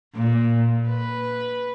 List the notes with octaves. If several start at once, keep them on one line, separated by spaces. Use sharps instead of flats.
A#2
B4